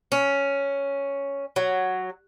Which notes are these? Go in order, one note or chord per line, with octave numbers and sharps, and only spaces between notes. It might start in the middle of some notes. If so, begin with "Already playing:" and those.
C#4
F#3